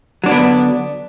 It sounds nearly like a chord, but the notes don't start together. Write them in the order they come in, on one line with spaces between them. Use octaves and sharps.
F#3 D4 D3 B3